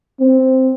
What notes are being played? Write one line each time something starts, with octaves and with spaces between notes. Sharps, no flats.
C4